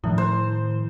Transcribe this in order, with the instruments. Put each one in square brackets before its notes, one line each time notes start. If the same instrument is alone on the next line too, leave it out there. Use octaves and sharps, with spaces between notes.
[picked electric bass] A2 A3 [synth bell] D#3 F3 E4
[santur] C5